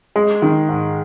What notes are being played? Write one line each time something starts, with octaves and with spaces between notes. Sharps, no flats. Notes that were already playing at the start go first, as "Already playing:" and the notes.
G#3
D#3
G#2